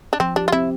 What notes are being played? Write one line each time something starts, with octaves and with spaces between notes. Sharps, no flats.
D4
F3 C4
D4 G4
F4
C4 E4